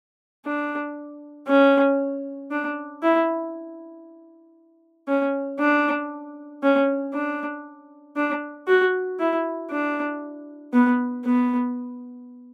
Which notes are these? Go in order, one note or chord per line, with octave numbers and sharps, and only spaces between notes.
D4
C#4
D4
E4
C#4
D4
C#4
D4
D4
F#4
E4
D4
B3
B3